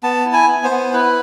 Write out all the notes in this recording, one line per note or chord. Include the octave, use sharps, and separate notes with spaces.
B3 A5
E4
G#5
B3
C5
B3
E4 B4